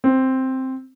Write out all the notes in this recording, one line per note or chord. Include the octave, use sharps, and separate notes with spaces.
C4